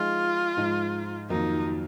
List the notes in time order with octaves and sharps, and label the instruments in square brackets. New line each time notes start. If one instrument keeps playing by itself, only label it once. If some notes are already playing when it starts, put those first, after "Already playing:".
Already playing: [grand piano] F3 G#3 D#4 G#4 [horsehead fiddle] F4
[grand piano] G#2 F3 G#3
[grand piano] F2 D#3 F#3 A#3 F4 [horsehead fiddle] D#4